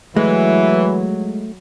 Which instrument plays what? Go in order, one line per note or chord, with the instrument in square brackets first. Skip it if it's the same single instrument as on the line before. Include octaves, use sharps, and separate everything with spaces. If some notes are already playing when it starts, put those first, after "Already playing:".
[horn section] E3 [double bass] F#3 [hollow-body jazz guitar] G#3 [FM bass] A3